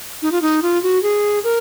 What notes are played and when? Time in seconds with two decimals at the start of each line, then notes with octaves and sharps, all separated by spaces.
0.22 D#4
0.32 F4
0.42 D#4
0.62 F4
0.83 F#4
1.03 G#4
1.44 A#4